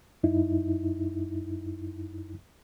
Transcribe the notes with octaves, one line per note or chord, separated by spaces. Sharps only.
F#2 D#4 E4